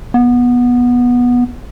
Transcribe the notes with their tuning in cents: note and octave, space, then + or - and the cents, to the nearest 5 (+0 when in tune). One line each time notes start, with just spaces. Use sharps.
B3 -15